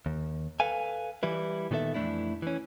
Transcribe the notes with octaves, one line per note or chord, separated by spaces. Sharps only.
D#2
A4 B4 F5 G#5
E3 G3 E4 B4
A#2 D#3 B3 A4 E5
F2 E3 A3 D4 E4
E3 C#4